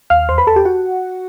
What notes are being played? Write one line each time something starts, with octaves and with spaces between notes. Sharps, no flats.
D#2 F5 F6
E2 C5 C6
B4 B5
E2 A4 A5
G4 G5
F#4 F#5